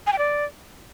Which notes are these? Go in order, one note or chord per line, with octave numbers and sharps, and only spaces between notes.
G#5
G5
D5